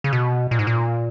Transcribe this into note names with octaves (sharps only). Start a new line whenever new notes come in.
C#3
B2
A#2
G#2
A#2